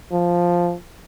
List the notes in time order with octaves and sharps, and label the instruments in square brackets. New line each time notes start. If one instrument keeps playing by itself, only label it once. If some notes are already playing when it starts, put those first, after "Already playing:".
[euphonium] F3